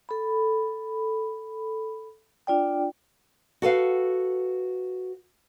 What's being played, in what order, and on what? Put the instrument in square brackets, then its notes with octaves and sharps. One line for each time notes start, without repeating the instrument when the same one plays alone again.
[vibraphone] A4 B5
D4 F4 D5 G5
[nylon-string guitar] F#4 A4 B4 F5